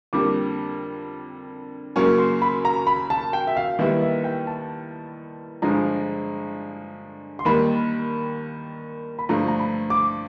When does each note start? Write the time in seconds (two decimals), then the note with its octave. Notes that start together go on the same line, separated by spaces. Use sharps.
0.13 F2 D3 G3 A#3 D6
1.96 F#2 C#3 F#3 A#3 C#4 C#6
2.18 C6
2.42 B5
2.65 A#5
2.87 B5
3.10 A5
3.33 G5
3.47 E5
3.57 F5
3.78 D#2 D#3 G3 B3 E4 E5
4.02 E5
4.24 G5
4.47 A5
5.62 G2 D3 F3 G#3 A#5
7.39 C6
7.45 D#2 D#3 G3 A#3 B5
9.19 B5
9.29 G2 D3 F3 A3 A#5
9.48 A#5
9.59 B5
9.90 D6